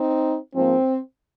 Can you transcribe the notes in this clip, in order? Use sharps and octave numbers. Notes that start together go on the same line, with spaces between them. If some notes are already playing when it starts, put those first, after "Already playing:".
Already playing: C4 D#4
G#2 F3 A#3 C4